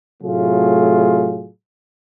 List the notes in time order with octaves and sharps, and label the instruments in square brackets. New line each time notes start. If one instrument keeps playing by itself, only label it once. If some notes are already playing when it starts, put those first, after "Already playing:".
[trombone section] A2 C3 F#3 A3 F4 G#4